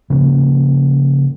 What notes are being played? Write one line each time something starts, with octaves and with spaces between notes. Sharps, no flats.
C#3 F3 A#3